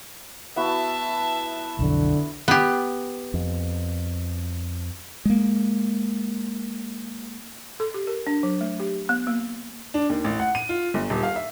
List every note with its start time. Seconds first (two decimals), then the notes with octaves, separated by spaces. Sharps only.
0.56 B3 E4 F#4 E5 A5
1.79 B1 F2 D3
2.48 B3 G4
3.34 F2
5.25 G#3 A#3
7.80 A4
7.94 G4
8.07 A#4
8.27 D4
8.43 F#3
8.61 A3
8.80 G4
9.09 B3
9.27 A#3
9.94 D4
10.10 D#2
10.24 A1
10.40 F#5
10.55 D#7
10.69 F4
10.94 G1
11.10 D#1
11.23 F5
11.36 E5